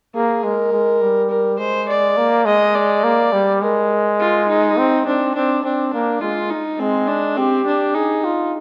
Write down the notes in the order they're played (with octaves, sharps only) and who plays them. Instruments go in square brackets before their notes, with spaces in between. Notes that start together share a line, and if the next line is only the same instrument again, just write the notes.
[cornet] A#3 [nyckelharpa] G#4
[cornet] G#3 [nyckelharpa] A#4
[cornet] G#3
G3
[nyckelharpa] A#4
[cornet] G#3 [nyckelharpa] C5
[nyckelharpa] D5
[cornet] A#3
[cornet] G#3 [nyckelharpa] D#5
[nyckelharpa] D5
[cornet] A#3
G3
[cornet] G#3 [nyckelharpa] A#4
[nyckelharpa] F4
D#4
[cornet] C4
[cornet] C4 [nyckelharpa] D4
[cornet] C4 [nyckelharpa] D4
[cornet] C4 [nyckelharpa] D4
[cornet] A#3 [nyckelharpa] D4
[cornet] G#3 [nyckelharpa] F4
[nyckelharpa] D#4
[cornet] G#3 [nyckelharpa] C4
[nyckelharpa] D4
[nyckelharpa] C4 [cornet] G4
[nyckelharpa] D4
[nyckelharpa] D#4 [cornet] G#4
[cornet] F4